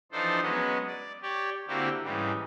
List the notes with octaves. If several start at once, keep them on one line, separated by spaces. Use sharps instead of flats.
E3 F3 D4 D#4 A4 C5
F#3 G#3 B3 C#4
D5
G4 C#5 D5
D3 A#3 C4 E4 F#4 G4
G#2 C#3 E3 G3